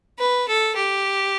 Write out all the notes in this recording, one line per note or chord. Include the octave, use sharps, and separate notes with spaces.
B4
A4
G4